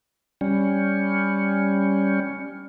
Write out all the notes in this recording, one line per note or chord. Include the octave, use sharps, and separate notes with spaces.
G3 C#4